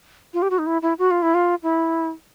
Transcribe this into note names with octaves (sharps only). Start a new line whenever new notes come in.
F4
G4
F#4
D#4
E4
E4
F#4
F4
E4
F4
E4